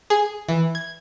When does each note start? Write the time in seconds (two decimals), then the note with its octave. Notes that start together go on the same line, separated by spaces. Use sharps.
0.10 G#4
0.48 E3
0.75 G#6